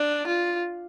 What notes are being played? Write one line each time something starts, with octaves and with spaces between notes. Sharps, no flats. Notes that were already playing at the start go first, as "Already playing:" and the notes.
Already playing: D4
F4